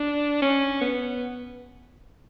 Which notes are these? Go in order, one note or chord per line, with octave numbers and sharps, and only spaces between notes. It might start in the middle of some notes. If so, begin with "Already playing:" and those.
Already playing: D4
C#4
B3